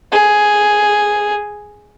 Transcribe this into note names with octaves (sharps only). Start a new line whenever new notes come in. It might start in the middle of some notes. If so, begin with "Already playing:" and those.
G#4